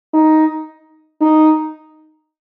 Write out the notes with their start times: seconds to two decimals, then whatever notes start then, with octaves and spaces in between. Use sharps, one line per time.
0.14 D#4
1.21 D#4